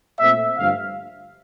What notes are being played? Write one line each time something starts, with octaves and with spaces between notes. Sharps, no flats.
A#2 A3 C4 E5
G2 D3 F3 A3 F5